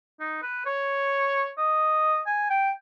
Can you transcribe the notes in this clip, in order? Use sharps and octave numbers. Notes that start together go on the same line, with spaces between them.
D#4
B4
C#5
D#5
G#5
G5